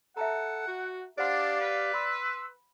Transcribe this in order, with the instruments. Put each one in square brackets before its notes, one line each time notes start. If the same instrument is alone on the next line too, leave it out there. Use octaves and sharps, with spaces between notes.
[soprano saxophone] A4 [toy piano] E5 A5 A#5 [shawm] F#5
[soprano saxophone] F#4
[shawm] D4 [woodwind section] G4 F5 [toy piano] C5 F#5 C6 [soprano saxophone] D5
[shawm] B4
[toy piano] B5 [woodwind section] C6 E6